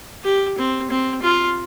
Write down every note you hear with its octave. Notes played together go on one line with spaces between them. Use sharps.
G4
C4
C4
F4